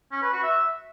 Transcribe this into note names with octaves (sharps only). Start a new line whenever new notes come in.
C#4
B4
F#4
E5